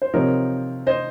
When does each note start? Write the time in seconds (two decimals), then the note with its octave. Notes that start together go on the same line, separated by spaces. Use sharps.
0.02 C5
0.13 C3 F3 C4 D#4 A#4 C#5
0.87 C5 D#5